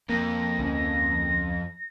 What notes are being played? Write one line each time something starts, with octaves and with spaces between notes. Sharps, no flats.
F2 A#3 A#6
D2 C#4